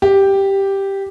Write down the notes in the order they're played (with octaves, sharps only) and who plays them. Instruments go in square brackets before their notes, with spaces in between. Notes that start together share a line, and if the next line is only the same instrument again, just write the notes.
[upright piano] G4